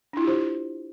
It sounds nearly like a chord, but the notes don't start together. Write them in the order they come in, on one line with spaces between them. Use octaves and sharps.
D4 E4 F4 G4 C5